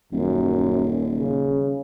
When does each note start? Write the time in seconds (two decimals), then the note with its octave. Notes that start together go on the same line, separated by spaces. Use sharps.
0.12 D#1 F#2
1.19 C#3